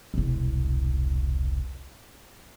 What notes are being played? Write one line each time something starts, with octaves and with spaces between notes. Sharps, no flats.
E1 C2